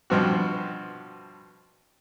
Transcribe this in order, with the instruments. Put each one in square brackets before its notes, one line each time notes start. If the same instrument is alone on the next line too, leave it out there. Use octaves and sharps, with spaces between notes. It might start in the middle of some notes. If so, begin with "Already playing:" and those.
[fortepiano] G2 B2 F3 C4 F#4